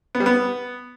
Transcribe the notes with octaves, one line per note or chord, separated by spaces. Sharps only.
B3
G3
B3